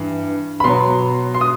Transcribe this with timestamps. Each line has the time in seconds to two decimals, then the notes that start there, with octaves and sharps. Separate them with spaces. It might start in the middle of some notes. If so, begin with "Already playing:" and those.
Already playing: G2 E3
0.60 B5
0.64 B2 F#3 C6
1.34 C6
1.41 D#6